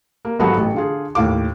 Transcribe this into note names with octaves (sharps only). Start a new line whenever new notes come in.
A#3
G#1 F#3 B3 F#4 A4 C#7
A1
D3 F4 G#4
D#2 A2 F5 D6